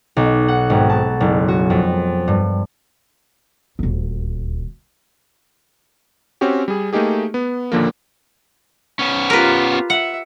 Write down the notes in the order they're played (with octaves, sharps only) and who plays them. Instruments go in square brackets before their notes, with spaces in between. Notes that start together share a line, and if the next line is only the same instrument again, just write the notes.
[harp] B1
F#5
G#1
A5
F#1
F#4
F2
G2
[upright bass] D#1 D2
[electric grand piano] C4 C#4 F#4 G4
G3 G#4
A3 A#3 D#4 G4 G#4
B3
D#2 A#2 D3 F3 A#3
[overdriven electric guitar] B3 C#4
[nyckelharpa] F4 G4 [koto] A#4 B4
[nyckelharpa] E5 [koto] F#5